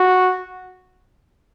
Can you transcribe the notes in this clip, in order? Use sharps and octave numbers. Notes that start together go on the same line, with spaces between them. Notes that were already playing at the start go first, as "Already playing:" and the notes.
Already playing: F#4